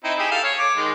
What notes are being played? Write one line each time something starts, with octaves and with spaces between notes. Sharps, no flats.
C4 D#4 E4
G4 G#4 E6
A4 F5
C#5
D6
D#3 G#3